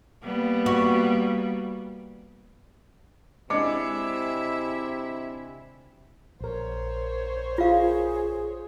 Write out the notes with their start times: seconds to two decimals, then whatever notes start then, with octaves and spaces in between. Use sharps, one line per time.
0.22 G3 A#3 B3
0.66 F#4
3.50 C3 G#3 D4 E4 D5 E5 D6 C#7
6.41 A#1 A#4 C5 C#5
7.58 F4 G#4 F5